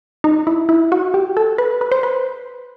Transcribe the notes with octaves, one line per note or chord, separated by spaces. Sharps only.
D#4
E4
E4
F#4
G4
A4
B4
B4
C5
B4